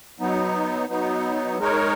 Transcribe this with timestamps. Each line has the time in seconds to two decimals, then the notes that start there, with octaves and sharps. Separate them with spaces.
0.20 F#3 B3 D#4
0.89 F#3 B3 D#4
1.58 G#3 D#4 A#4 C#5